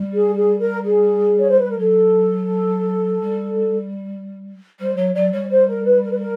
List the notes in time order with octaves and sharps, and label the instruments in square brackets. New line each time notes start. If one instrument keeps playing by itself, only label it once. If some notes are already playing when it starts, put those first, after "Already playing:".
Already playing: [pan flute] G3
[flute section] G#4
G#4
A#4
G#4
C#5
C5
B4
A#4
[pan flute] F#3 [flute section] A4
[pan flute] G3
[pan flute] G3 [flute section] C5
[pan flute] F#3 [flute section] C#5
[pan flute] F#3 [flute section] D5
[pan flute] G3 [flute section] C#5
[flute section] C5
A#4
B4
A#4
B4
A#4